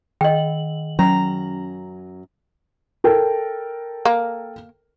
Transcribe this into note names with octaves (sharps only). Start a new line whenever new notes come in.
D#3 D#5 G5 F#7
F#2 F#3 C#4 A#5
A4 A#4 G5
A#3